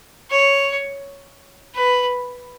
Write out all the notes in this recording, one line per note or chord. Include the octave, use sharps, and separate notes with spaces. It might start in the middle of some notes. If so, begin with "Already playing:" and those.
C#5
B4